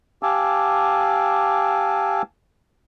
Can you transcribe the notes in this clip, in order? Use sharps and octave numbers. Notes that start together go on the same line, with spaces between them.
G4 F5 G#5 A5 D6 E6